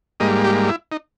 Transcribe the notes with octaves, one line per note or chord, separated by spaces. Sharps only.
G#2 G3 A#3 D#5
G4
E4
D#4